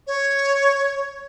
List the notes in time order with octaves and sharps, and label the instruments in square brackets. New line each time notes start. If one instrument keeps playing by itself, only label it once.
[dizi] C#5